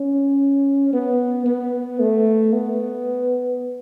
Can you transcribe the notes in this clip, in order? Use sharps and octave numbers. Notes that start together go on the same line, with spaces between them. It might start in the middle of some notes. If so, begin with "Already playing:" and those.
Already playing: C#4
B3
B3
A3
B3